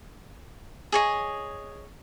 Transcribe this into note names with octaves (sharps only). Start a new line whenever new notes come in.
G#4 C#5 D#5